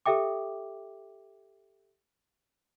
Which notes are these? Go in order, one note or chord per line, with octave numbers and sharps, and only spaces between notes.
G4 A4 E5 G5 D6